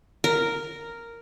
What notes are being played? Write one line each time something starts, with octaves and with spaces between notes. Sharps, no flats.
A#4